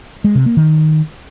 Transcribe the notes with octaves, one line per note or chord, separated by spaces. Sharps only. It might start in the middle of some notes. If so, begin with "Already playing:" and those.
G#3
C3
A#3
D#3